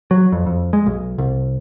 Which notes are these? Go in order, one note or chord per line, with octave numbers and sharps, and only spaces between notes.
F#3
F2
F2
G#3
B1
C2